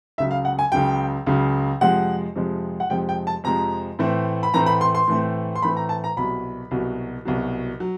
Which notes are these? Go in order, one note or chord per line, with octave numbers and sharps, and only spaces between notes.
C#2 C#3 F#3 E5
F5
F#5
G#5
C#2 C#3 F#3 G5
C#2 C#3 F#3
F2 C3 F3 G#3 F#5
F2 C3 F3 G#3
F#5
F2 C3 F3 G#3 G5
G5
A5
F2 C3 F3 G#3 A#5
A2 E3 A3 C4
B5
A2 E3 A3 C4 A#5
B5
C6
C6
A2 E3 A3 C4
C6
A2 E3 A3 C4 B5
A#5
A5
A#5
C2 B2 F#3 B5
C2 B2 F#3
C2 B2 F#3
F#3